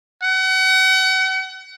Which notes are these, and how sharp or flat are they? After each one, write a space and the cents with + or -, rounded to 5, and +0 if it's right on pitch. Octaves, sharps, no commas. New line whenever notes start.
F#5 +35